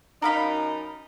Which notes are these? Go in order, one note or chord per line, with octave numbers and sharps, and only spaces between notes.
F#2 D#4 A#4 F5 B5